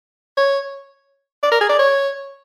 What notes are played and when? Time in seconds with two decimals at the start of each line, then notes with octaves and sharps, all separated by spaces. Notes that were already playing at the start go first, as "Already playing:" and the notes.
0.37 C#5
1.43 D5
1.52 A#4
1.61 G#4
1.69 D5
1.79 C#5